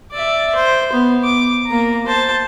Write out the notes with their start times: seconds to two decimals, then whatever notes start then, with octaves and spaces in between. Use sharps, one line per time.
0.12 D5 E5
0.55 C5
0.93 B3
1.24 D6
1.66 A#3 A#5
2.06 C5 A5